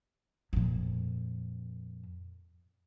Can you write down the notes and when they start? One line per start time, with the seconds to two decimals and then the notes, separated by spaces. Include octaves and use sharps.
0.53 F2 A#2